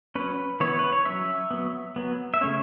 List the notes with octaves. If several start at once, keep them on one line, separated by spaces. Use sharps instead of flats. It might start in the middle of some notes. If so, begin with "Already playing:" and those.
F#3 C#4 B4
E3 B3 C#5
B4
C#5
F#3 C#4 E5
F#3 B3
F#3 B3
E5
C#3 A3 C#4 C#5